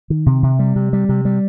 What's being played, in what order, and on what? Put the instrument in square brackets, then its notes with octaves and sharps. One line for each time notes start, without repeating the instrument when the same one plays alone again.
[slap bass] D#3
C3
C3
G3
C3
G3
C3
G3